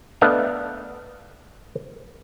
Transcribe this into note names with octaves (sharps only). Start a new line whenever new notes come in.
A3 B3 D4 D#5 F5